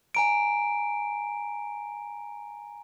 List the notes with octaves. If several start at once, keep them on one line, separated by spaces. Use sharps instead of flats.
G#5 A#5 D7